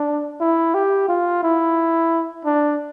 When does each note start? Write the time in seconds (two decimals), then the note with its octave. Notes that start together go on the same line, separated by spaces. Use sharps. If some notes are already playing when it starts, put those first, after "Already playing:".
Already playing: D4
0.41 E4
0.74 G4
1.09 F4
1.43 E4
2.45 D4